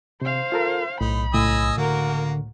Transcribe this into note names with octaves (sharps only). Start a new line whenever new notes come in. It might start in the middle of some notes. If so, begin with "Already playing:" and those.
C3 C5 F5
F4 A4 A#4
B1 A2 D#4 B5
C#2 A2 D#5 G#5 E6
D3 A#3 F#4 A#4